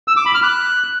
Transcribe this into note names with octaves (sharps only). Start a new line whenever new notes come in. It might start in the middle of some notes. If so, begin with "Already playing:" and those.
E6
D6
B5
F6
F#6